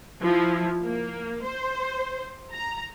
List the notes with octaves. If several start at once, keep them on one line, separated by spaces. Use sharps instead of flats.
F3 E4
A#3
C5
A#5